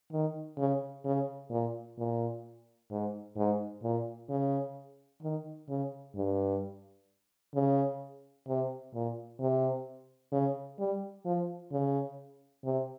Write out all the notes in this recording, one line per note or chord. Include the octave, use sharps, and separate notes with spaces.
D#3
C#3
C#3
A#2
A#2
G#2
G#2
A#2
C#3
D#3
C#3
G2
C#3
C3
A#2
C3
C#3
G3
F3
C#3
C3